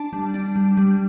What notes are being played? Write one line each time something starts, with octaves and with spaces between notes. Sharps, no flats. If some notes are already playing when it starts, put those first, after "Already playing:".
Already playing: D4 A5
G3
D4
G3
G3